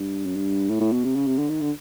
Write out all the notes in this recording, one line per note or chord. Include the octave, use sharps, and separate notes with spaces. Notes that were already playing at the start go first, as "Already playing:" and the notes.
Already playing: G2
F#2
G2
A2
A2
B2
C3
C#3
C3
D3
D#3
D3